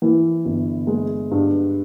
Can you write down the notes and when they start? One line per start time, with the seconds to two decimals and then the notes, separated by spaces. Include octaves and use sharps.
0.02 E3
0.45 G1
0.87 G#3
1.31 G2